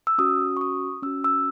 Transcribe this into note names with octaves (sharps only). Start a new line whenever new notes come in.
E6
C#4 F#4 D#6
C#6
D#6
C#4 F#4 E6
E6